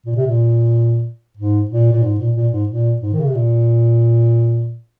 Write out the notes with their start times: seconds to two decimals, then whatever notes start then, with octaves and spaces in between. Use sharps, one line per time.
0.06 A#2
0.16 C3
0.27 A#2
1.37 G#2
1.70 A#2
1.92 A#2
2.03 G#2
2.19 A#2
2.36 A#2
2.52 G#2
2.69 A#2
3.02 G#2
3.13 D#3
3.20 C#3
3.27 C3
3.35 A#2